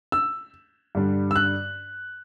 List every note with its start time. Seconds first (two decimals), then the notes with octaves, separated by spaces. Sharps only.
0.12 E6
0.95 G2 D3 G3 D4
1.31 E6
1.36 F#6